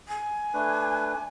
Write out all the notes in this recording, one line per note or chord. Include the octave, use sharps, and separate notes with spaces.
G#5
A3 D4 B4